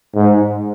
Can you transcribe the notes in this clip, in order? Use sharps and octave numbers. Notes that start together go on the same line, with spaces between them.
G#2